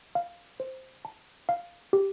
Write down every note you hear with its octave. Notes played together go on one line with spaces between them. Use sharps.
F5
C5
A5
F5
G4